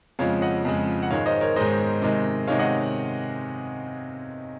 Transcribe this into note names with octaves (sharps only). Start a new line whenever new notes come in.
F2 C#3 F3 G#3 C#5 F5
D#5 F#5
F2 C#3 F3 G#3
F#5
G#2 D#3 G#3 C#5 F5
C5 D#5
A#4 C#5
G#2 D#3 G#3 C5 D#5
C3 D#3 G#3
C3 D#3 G#3 C#5 F5
D#5 F#5